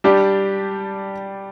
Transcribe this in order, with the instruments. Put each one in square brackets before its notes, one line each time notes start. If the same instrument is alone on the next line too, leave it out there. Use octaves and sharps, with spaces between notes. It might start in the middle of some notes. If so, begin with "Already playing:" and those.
[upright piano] G3 D4 G4 D5